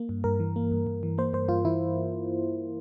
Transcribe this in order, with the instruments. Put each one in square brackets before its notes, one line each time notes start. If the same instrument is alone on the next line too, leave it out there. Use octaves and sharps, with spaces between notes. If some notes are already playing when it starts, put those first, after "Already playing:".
Already playing: [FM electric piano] A#3
G2
G2 A#4
E3
A#3
G2
G2
E3
A#3 C5
G2 C5
G2 F4
E3 E4